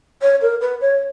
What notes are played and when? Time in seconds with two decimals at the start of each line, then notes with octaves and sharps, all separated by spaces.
0.21 C#5
0.41 A#4
0.60 B4
0.80 C#5